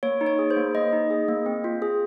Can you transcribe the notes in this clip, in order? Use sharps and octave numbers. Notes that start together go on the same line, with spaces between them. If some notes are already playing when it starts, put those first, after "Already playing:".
A#3 C#5
D#4
C#5
G#4
C5
A#3
A#3 D#5
D#4
G#4
A#3
C4
F4
G#4